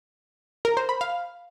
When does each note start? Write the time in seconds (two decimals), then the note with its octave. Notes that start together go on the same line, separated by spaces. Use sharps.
0.65 A#4
0.77 C5
0.89 B5
1.01 F5